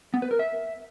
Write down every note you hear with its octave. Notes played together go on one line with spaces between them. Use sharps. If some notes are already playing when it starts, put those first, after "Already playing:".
B3
B4
A#4
E5